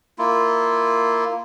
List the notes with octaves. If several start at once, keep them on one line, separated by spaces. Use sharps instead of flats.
A#3 E4 F4